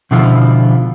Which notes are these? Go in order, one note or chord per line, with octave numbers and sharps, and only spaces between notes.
B2 D3 F3 E4 F4